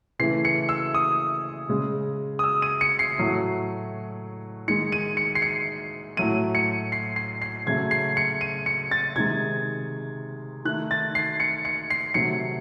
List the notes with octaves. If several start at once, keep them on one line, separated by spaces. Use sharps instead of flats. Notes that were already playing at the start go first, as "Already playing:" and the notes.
C#3 E3 A3 C7
C#7
E6
D#6
C#3 G#3
D#6
E6
D#7
C#7
C7
A2 F#3 A3
D#3 G#3 C#7
D#7
C#7
C7
C#7
A2 F#3 A3 D#7
C#7
C7
C7
C7
C#3 F#3 A3 G#6
C7
C#7
D#7
C#7
A6
C3 D#3 G#3 G#6
D#3 A3 F#6
A6
C7
C#7
C#7
C7
C3 D#3 F#3 A3 C#7